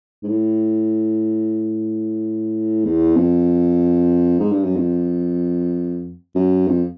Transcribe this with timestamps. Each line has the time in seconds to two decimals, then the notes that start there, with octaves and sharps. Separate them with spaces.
0.23 G#2
0.28 A2
2.84 E2
3.16 F2
4.39 G#2
4.52 G2
4.64 F#2
4.76 F2
6.35 F#2
6.68 F2